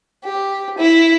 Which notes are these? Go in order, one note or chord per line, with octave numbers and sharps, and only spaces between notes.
G4
E4